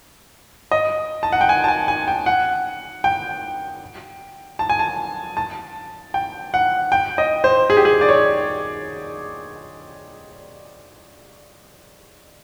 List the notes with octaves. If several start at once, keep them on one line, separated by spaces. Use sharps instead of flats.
D#5
A5
F#5
G5
G#5
A5
G#5
G#5
G5
F#5
G5
A5
G#5
A5
A5
G5
F#5
G5
D#5
C5
G#4
G4
G#4
D5
C#5